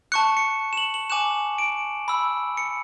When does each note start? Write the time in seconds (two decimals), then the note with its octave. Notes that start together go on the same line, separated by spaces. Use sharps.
0.12 A5 C#6 F#6 C#7
0.37 C#7
0.73 E7
0.77 F#7
0.94 F#7
1.10 G#5 D6 F#6 E7
1.58 D7
2.08 B5 E6
2.57 C#7